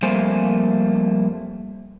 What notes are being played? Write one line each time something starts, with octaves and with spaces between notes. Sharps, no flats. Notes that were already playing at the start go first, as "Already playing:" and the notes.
F2 G3 A3 A#3 C5 G#5